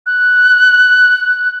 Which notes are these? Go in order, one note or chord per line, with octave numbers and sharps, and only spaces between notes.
F#6